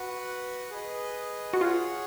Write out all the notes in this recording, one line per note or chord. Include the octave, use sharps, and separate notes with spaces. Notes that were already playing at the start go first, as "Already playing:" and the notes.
Already playing: F#4 B4 F#5
G#4 B4 D#5
F#4
F4 G#4 C#5 F#5